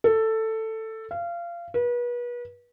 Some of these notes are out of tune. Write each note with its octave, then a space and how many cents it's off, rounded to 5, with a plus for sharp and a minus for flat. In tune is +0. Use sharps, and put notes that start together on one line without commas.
A4 +10
F5 -25
B4 -35